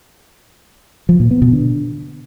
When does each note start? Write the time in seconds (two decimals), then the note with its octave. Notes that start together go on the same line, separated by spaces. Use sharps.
1.09 F3
1.20 A#2
1.31 B3
1.42 B2
1.53 D3